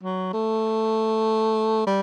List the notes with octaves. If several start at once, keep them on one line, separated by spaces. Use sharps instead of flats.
F#3
A3
G3